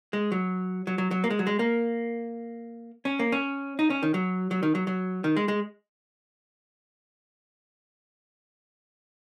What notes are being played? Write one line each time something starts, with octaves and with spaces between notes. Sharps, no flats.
G#3
F#3
F#3
F#3
F#3
A#3
G#3
F#3
G#3
A#3
C#4
A#3
C#4
D#4
C#4
D#3
F#3
F#3
D#3
F#3
F#3
D#3
G#3
G#3